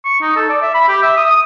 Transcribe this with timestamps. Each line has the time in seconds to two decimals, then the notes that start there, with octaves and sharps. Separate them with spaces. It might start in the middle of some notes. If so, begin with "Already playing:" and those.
0.05 C#6
0.21 D#4
0.36 A4
0.49 D5
0.62 E5
0.74 B5
0.88 G4
1.02 E5
1.17 D#6
1.30 D#6